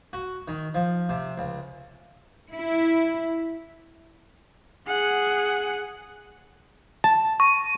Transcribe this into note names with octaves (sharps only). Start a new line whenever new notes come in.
F#4
D#3
F3
C3
C#2
E4
G#4 F#5
A5
C#6